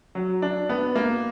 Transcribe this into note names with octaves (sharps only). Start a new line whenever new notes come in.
F#3
D4
B3
A#3